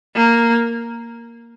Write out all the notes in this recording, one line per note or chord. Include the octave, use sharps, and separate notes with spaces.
A#3